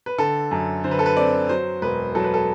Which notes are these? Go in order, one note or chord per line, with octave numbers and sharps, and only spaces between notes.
B4
D3 A4
F#2
D3 C5
B4
A4
B4
C4 D5
F#3 C5
E1 B4
F#3 A4
B4
A4